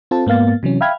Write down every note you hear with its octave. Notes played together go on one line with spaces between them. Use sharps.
C4 F4 A4 A5
G#2 A#3 B3 F5 A6
C3 E3 F#3 C#4
E5 F5 G5 B5 F6 G#6